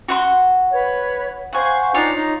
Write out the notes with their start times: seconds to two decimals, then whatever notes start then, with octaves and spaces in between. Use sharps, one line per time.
0.08 F#4 F#5 C6
0.71 B4 C#5
1.53 C5 F5 F#5 G#5 C#6
1.94 D4 D#4 F4 C#5
2.15 D#4